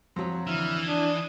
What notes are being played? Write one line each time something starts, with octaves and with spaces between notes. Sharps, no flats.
F2 F#3
D3 E3 E5 F6
D4 D#6